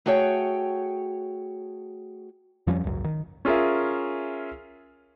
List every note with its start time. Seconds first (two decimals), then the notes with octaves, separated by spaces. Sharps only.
0.06 A3 F#4 G#4 C#5 G5
2.67 F2 F3 G3 C#4
2.84 G#1 C#2 F#2
3.04 D#3
3.45 C#4 F4 G#4 A#4 E5